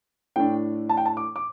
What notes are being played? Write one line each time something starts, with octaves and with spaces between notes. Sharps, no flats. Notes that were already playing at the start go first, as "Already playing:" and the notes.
A2 A3 D4 G5
A5
G5
A5
D6
D6